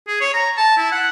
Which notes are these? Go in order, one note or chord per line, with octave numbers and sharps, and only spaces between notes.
G#4
C#5
A#5
A5
E4
F#5